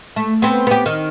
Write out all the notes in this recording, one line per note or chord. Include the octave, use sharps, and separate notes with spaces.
A3
B3 C4
B3 G4
D#3